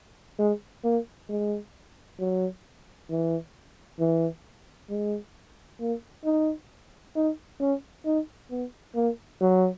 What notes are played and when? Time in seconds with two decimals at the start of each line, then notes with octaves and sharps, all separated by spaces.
0.39 G#3
0.84 A#3
1.29 G#3
2.19 F#3
3.10 E3
4.00 E3
4.90 G#3
5.80 A#3
6.25 D#4
7.16 D#4
7.60 C#4
8.05 D#4
8.50 B3
8.95 A#3
9.41 F#3